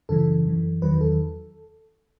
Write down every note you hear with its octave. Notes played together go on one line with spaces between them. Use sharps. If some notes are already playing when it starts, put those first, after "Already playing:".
F#2 C#3 E3 A4
F#2 E3
E2 D#3 F#3 B4
A4